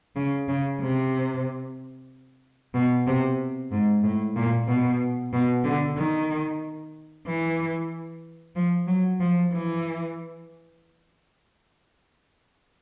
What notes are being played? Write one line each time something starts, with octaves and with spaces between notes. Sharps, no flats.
C#3
C#3
C3
B2
C3
G#2
A2
A#2
B2
B2
D3
D#3
E3
F3
F#3
F3
E3